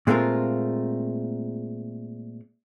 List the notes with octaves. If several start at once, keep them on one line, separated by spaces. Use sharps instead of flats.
A#2 G#3 A3 C4 F4 A#4